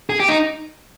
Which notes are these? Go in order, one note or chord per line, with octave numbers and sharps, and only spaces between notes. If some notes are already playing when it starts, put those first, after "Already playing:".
G#4
G4
D#4